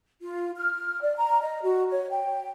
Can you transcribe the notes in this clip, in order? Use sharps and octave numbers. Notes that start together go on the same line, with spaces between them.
F4
F6
D5
A#5
D#5
F#4
C#5
G5